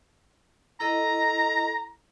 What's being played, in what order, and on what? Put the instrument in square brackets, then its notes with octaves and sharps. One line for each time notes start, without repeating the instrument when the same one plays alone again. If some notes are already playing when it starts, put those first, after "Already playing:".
[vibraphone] E4 A4 D#5 [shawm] A#5